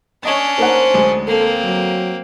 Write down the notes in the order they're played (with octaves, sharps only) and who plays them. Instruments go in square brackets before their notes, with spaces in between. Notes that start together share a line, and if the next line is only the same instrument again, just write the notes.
[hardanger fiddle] C#4 D4 [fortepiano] C#5 D#5 A5
[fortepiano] A#3 D#4 F#5 [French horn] C5
[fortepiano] D2 G#3
[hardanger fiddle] A#3 C4 [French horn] A4
[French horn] F#3